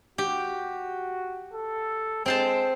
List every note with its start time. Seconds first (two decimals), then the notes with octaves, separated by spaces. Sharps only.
0.18 F#4 G4
1.53 A4
2.26 G#3 C4 C5 A5